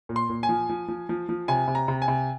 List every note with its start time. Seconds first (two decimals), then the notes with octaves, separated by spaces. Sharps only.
0.09 A#2
0.16 C6
0.29 A#2
0.43 G#5
0.49 F3
0.69 F3
0.88 F3
1.09 F3
1.29 F3
1.48 C3 G#5
1.68 C3
1.75 A#5
1.88 C3
2.02 G#5
2.08 C3